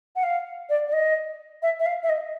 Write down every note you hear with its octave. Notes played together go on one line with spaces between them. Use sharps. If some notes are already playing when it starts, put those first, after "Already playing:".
F#5
F5
D5
D5
D#5
E5
E5
F5
E5
D#5